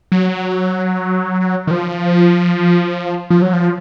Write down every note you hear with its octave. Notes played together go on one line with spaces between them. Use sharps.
F#3
D#3
F3
F3
F#3
F3